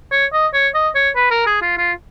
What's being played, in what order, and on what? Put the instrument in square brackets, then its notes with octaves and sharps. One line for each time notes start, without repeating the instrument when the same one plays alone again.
[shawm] C#5
D#5
C#5
D#5
C#5
B4
A#4
G#4
F4
F4